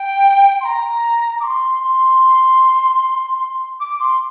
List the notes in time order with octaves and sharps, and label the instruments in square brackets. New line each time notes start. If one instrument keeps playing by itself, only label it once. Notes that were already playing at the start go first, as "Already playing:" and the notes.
Already playing: [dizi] G5
C6
A#5
D6
C6
C6
D6
C6